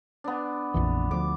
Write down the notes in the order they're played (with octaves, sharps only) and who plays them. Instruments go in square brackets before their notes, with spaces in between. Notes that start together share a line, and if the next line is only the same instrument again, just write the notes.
[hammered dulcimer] B3 D4
[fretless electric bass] A#1 F2 E3
[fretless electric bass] D2 F3 [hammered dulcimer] D6